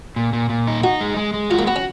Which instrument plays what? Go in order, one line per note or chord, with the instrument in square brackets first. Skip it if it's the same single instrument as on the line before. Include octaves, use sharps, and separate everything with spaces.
[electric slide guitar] A#2
A#2
A#2
D#4
[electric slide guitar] D#4 [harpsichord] F#4
[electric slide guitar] G#3
G#3
G#3
[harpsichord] F4 [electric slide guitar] F#4
[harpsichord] A#3
[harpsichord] B3 [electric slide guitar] F#4
[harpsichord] C#4